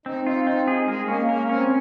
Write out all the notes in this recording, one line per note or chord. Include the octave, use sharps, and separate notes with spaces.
C4 D#4
D#4 F4
C4 D#4
G#4
G#3 A#4
A#3 C#4
A#3 A#4
C4 C#4